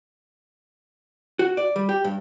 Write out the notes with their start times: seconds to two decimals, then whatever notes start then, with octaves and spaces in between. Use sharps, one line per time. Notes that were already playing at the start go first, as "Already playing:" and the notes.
1.39 F#4
1.57 D5
1.76 G3
1.89 G4
2.04 G2